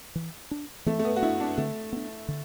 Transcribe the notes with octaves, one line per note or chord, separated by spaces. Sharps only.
E3
D4
E3 A3
A3
B3
F#4
D4 E4
D4
D3 A3
B3 D4
D3